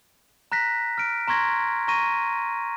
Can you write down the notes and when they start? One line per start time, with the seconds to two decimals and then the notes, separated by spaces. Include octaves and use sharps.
0.52 A#5 F#6 A#6 B6
0.98 F6 D7
1.28 A#5 C6 C#6 G#6 A#6
1.88 A#5 C#6 A#6 D#7